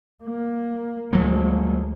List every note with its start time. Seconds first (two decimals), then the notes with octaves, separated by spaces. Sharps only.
0.24 A#3
1.13 D2 F3 F#3 G#3 A#3